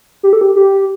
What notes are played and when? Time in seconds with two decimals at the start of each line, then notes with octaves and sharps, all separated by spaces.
0.23 G4
0.33 A4
0.41 G4
0.56 G4